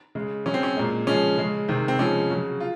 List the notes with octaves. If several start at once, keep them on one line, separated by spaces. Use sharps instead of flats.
C#3 G#3
C#3 F#3 C#4
C4
C#4
A#2 G#3
C#3 F3 G#3 C#4
C#3 G#3
C3 D#3 G#3 C4
C4
C#3 F3 G#3 C#4
C#3 F#3
F4